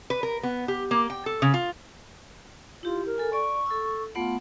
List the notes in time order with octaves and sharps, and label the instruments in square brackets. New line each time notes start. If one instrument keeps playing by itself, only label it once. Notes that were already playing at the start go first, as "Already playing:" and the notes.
[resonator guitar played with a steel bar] B4
A#4
B3
G4
A#3
G5
A4
C#3
F4
[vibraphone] E4 G4 [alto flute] F4
[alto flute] A#4
[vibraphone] A4 G#5
[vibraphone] D5 [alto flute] C#6
[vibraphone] A4 E6
[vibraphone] A3 B3 F#5 [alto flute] F4